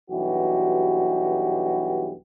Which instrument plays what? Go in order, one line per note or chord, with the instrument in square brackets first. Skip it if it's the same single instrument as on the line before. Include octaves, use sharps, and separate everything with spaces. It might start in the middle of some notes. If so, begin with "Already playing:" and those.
[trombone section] B1 G2 E3 F#4 G4